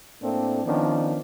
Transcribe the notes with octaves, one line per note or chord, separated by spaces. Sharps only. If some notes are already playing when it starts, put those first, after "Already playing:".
A2 A3 A#3 C4 D4
D#3 F3 B3 C#4 D4